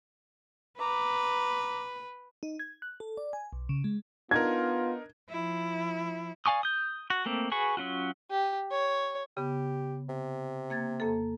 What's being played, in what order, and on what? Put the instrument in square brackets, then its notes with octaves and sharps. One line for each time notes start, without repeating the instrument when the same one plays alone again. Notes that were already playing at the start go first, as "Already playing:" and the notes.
[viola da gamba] B4 [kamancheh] A#5 D6
[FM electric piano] D#4
G#6
F#6
A4
D5
G#5
B1
C#3
G#3
[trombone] B3 [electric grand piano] D4 D#4 A#4 [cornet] F4 [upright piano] G#6
[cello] F3 E4
[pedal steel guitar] D5 F5 G#5 C#6 D#6
D#6 G6
F#4
A3 A#3 C4
F#4 G#4 B4 C#6
F#3 C#4 F4 F#4
[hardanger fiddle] G4
C#5
[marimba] C#3 B3 [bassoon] G4
[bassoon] C3
[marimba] A#3 G#6 A6
F2 A#3 A4